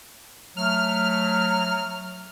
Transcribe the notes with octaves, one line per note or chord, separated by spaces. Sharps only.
F#3 A3 F6